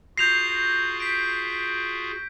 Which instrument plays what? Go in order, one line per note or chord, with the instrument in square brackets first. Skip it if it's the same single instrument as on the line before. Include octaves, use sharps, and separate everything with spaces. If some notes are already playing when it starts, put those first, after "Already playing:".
[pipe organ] F4 F#4 G#4 [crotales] G6 A#6 [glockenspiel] C7 F7
[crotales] B6 D7